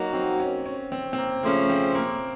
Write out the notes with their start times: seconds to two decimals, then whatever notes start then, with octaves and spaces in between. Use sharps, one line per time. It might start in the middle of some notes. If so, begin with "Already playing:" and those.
Already playing: F#3 A#3 D#4 F#4
0.13 C4
0.40 C#4
0.66 C#4
0.92 C4
1.13 C4
1.18 A#3
1.43 C#3 F3 A3 A#3 C#4
1.70 C4
1.95 A#3